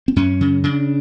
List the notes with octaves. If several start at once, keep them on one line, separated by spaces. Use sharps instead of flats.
C4
F#2 C#4
C#3
C#3 D4